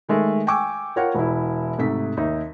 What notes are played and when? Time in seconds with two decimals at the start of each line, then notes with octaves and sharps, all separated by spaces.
0.09 D#3 G#3 A3
0.47 G5 G#5 C#6 D6 E6
0.96 F4 A#4 C#5 F#5 G5
1.15 E1 E4
1.78 G#2 C3 A3 B6
2.17 D#2 D#4 E5